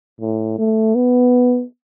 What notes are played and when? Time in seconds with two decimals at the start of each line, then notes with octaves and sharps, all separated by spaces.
0.20 A2
0.58 A3
0.95 B3